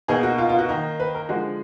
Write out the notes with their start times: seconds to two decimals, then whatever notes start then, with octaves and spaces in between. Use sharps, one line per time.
0.08 B2 A#3 D#4 G#4
0.23 F#4
0.38 F4
0.49 F4
0.59 F#4
0.69 D#3 A#3 D#4
1.00 B4
1.15 A#4
1.29 D3 F3 G#3 F#4